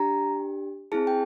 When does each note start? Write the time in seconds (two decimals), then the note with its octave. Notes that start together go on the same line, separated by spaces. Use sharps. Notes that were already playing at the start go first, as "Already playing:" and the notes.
Already playing: D4 G4 A#5
0.92 C4 E4 G#4 A5
1.07 G5